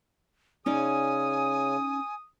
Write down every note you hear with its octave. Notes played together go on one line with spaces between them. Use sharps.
C#3 C#4 D#4 D5 G#5 D#6